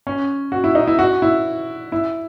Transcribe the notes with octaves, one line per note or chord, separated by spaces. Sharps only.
C#4
F#4
E4
D#4
E4
F#4
E4
E4